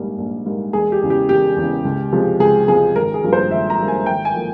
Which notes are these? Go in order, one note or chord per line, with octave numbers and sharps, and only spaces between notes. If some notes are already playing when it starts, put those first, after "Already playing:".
Already playing: A#1 G#2 G3 A#3
A#1
G#2 G3 A#3
E1 G#4
G4
E2 C#3
G4
E1 G4
E2 C#3
C#2
C3 F3 G#3
C#2 G#4
C3 F3 G#3 G#4
G#1 A#4
G#4
G2 F3 A#3
C5
G#1 E5
A#5
G2 F3 A#3
G#5
G#1 G5
G#5
F3 A#3